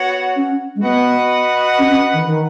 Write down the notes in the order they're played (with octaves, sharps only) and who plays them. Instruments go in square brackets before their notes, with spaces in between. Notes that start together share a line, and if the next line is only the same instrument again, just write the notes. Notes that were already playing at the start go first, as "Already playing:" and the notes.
Already playing: [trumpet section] B3 F#4 C#5 F#5
[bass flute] C#4
G#3
[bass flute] B3 [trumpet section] F#4 B4 D#5 F#5
[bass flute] C#4
C#4
D#3
D#3